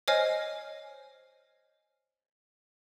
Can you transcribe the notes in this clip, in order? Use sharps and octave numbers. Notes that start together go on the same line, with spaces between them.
C5 C#5 D#5 G#5 F6 C7